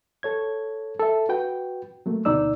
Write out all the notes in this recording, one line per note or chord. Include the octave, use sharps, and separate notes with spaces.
A4 C#5 G#6
A4 E5
F#4 B4 G5
F#3 A3 A#3
D2 B2 D#4 D5 D#5 E6